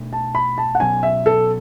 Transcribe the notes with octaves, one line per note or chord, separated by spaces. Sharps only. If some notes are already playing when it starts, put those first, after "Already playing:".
Already playing: B2 A3 D4
A5
B5
A5
F#5
B2 F#3 C#4 G#5
E5
A4